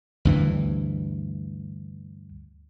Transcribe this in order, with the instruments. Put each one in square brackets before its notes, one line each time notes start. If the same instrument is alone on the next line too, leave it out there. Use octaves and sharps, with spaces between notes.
[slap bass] D2 G2 E3